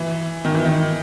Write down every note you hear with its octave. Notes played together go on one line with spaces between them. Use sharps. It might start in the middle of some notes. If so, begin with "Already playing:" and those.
Already playing: E3
D#3
E3
D#3